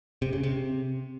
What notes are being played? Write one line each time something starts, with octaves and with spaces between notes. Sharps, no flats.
C3
C#3
C3